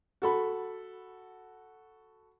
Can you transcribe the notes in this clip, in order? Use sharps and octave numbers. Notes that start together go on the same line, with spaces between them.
F#4 A4 B5